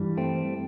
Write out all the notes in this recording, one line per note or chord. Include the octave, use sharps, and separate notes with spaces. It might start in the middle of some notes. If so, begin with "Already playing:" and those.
Already playing: G2 E3 G3
A3 C4